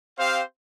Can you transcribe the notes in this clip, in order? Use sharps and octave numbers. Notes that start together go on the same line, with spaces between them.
C4 G4 C5 F5